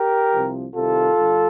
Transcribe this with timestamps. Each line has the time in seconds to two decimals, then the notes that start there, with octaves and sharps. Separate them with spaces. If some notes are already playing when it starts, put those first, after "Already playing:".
Already playing: G4 A#4
0.32 C2 C3 F3
0.75 C2 C3 D#3 F4 A4
1.18 G2 D3 G3